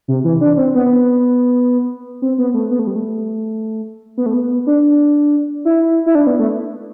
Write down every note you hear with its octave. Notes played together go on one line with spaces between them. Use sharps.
C3
E3
D4
C4
B3
C4
B3
A3
B3
A3
G3
A3
B3
A3
B3
D4
E4
E4
D4
B3
A3